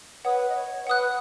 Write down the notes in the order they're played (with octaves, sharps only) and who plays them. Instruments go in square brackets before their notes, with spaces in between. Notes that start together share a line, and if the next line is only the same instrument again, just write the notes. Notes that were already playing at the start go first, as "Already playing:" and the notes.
[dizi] B4 [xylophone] C#5 F#5 D#6
[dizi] D#5
C#5
[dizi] B4 [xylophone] F#5 D#6 F#6